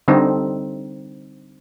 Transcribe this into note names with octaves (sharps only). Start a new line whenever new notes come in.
D3 G3 C4 D#4